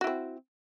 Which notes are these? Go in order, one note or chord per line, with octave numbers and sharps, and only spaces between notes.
C4 E4 F#4